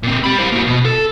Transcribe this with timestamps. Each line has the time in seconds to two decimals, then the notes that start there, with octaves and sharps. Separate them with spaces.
0.03 A#2 C4
0.24 G4 B5
0.39 E4 C5
0.52 A#3 F#4
0.66 B2
0.85 A4